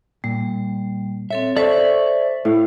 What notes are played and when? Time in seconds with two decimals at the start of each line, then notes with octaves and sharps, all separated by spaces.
0.24 A#2 G3
1.31 C4 A4 C#5 E5
1.57 A4 C5 D5 E5 C#6
2.45 A2 A3 F5